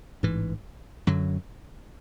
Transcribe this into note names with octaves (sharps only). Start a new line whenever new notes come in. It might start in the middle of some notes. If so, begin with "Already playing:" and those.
A1 G#2 E3
F#2 D3 F#3